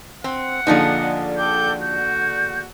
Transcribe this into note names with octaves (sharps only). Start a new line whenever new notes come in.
C4 F#5
A#1 D3 F3 D4 D#4 D#5 G#5
A4 G5 D6 G6
F#4 G6